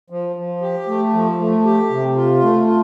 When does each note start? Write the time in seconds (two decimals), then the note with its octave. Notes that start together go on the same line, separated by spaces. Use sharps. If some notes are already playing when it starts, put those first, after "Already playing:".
0.10 F3
0.36 F3
0.61 G4
0.87 A3
1.13 F3
1.39 A3
1.65 G4
1.90 C3
2.16 F4
2.42 A3
2.68 F4